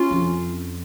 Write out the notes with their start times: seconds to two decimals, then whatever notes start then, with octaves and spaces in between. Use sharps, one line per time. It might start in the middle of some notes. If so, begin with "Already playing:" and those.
Already playing: C#4 F4
0.11 F2